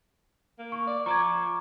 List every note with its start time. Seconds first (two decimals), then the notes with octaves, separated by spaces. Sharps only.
0.59 A#3
0.72 C#6
0.87 D5
1.06 F3 A#5 C#6 D6 G#6